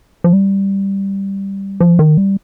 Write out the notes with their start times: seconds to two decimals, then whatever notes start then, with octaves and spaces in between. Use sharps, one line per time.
0.24 F3
0.33 G3
1.81 F3
1.99 D#3
2.17 G3